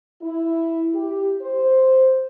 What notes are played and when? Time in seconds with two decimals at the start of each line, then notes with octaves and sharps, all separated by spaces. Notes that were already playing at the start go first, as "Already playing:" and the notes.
0.22 E4
0.95 G4
1.42 C5